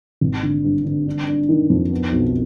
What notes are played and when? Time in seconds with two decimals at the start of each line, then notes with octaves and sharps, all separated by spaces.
0.21 G#1
0.43 D3
0.64 G2
0.85 D3
1.07 D4
1.28 D4
1.49 D#3
1.70 F2
1.92 B3
2.12 B1